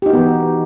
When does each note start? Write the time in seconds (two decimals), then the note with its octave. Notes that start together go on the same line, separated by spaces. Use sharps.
0.02 G4
0.06 D#4
0.10 F#4
0.13 B3
0.17 E3